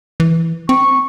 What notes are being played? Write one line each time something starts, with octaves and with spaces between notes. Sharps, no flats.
E3
C4 C#6